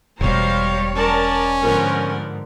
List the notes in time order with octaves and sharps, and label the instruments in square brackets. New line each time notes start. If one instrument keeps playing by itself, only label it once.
[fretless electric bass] E1 B2 [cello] G3 C#5 [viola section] C5 F5 A#5
[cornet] C#4 [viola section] A#4 D5 A5
[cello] G#2 D3 [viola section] F3 B3 A#4